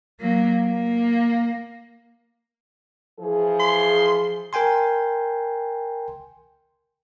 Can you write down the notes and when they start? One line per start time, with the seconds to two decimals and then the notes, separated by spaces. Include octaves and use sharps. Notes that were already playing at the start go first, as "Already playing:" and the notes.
0.20 F#3 A#3
0.64 A#3
3.19 E3 F3 G#4
3.60 C6
4.53 A#4 G5 G#5 C6